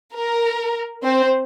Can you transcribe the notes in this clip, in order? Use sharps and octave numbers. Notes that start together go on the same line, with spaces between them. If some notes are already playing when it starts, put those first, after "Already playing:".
A#4
C4 C5